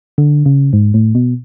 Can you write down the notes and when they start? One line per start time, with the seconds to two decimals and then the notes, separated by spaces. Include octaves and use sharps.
0.18 D3
0.46 C#3
0.73 G#2
0.94 A2
1.15 B2